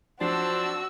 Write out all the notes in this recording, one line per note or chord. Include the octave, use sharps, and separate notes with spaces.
F3 F#3 C4 D4 F#4 C5 E6 C7